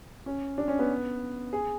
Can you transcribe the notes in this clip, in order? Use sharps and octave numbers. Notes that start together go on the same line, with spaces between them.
C#4
D4
C#4
B3
G#4